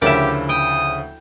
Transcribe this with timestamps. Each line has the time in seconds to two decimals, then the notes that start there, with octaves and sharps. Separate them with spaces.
0.02 D2 C#3 F3 E4 G4 A#4 D5 E7
0.49 G5 D#6